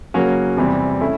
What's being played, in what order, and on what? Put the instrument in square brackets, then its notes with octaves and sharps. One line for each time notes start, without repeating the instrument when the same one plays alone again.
[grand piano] C#3 F#3 A#3 C#4 F#4
E2 C3 E3 G3 C4
A3 C#4 E4